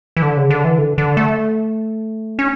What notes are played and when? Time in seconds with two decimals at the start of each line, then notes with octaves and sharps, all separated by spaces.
0.17 E3
0.22 D3
0.37 C#3
0.50 D3
0.64 E3
0.78 D3
0.98 D3
1.17 A3
2.39 C#4